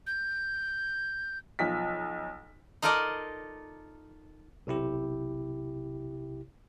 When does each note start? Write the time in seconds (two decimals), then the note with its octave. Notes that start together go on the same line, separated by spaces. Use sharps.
0.07 G6
1.59 B1 F3 B6
2.82 D#4 F4 A4 A#4 D5 D#5
4.67 B1 C3 E4 G4